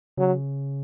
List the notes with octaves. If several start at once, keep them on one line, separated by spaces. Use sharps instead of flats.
C#3 F#3